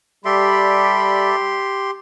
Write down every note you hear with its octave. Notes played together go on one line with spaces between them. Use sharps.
G3 G4 A4 D5 E5 B5 C6